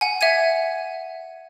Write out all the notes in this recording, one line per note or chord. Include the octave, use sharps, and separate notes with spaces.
F#5 G#5
E5 F#5 G#6 D#7